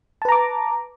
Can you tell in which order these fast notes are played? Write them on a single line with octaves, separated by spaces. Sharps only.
A5 B4 A#5 D6